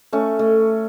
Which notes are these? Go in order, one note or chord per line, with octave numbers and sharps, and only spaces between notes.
A3 C#4
A3